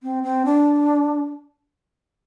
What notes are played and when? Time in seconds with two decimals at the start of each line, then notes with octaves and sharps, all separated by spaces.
0.03 C4
0.24 C4
0.45 D4